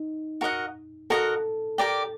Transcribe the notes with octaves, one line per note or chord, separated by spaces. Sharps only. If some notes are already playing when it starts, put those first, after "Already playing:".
Already playing: D#4
F#4 A#4 D#5 F#5
F#4 A4 A#4 D#5 F#5
G4 A#4 D5 G5